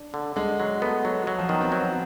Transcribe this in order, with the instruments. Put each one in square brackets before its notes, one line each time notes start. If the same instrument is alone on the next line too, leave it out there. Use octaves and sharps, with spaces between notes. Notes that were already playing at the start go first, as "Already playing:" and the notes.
Already playing: [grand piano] D4
[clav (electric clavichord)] D3
[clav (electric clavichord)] D3 [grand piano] G#3
[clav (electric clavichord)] F#3
[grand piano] A3 [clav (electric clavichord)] B3
[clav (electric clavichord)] F#3
F#3
[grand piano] F3
[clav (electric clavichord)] D#3 [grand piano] B3
[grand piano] C4
[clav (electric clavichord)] F#3 [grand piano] B3